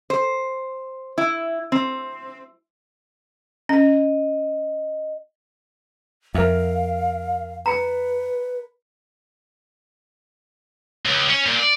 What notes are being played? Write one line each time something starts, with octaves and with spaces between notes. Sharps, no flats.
C5
E4
C4
C#4 D#5
F2 A#4 E5 F5
B4 A#5 B5 C#7
C#2
C#4
A#2
D5